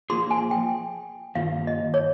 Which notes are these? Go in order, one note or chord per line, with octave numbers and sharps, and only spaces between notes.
F3 A#3 F4 G#4 C6
G#5
G5
G2 D#3 A#3 F4 F5
D#5
C#5